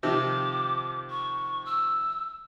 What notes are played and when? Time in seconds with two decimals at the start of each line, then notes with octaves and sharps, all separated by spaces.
0.03 C3 D#3 F3 D6
1.09 C#6
1.65 E6